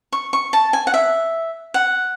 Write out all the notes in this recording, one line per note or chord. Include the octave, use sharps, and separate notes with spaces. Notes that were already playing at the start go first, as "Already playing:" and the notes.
C#6
C#6
A5
G#5
F#5
E5
F#5